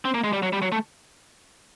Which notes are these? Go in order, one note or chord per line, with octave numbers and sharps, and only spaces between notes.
C4
A#3
G#3
G3
F#3
G3
F#3
A3